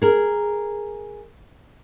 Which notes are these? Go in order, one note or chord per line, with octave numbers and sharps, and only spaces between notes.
G#4 A#4